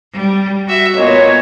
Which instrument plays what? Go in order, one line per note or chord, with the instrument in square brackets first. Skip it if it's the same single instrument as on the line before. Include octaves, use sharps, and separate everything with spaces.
[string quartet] G3
F#4 E5
[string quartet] A#2 B3 [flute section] C#5 D#5